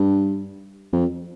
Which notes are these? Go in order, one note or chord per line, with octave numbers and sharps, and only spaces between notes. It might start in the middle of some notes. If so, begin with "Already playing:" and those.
Already playing: G2
F2